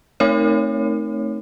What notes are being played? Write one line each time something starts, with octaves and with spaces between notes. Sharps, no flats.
A3 C4 D#4 A#4 C#5